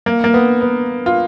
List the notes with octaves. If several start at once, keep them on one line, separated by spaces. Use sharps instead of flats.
A#3
A#3
B3
B3
F4